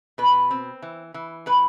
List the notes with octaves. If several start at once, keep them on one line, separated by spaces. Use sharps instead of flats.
B2 B4
C4
E3
E3
A2 B4